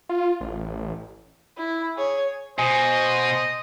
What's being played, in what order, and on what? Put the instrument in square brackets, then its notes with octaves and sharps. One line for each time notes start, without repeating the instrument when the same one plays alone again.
[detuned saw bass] F4
A1
[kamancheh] E4
G#4 C#5
[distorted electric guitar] B2 [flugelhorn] C5 [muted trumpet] D#5 [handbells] G#5